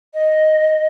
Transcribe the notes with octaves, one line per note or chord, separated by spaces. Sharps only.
D#5